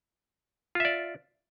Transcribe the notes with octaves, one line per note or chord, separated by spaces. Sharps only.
F4 D5 E5